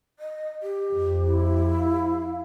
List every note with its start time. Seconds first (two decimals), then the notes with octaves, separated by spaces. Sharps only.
0.19 D#5
0.63 G4
0.92 F2
1.26 E4
1.77 F5